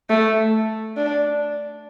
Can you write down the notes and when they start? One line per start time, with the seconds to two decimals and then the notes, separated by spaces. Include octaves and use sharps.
0.10 A3
0.97 D4